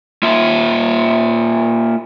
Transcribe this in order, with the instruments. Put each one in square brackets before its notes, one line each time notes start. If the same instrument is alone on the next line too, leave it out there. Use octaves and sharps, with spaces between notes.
[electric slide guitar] A#3 F4 E5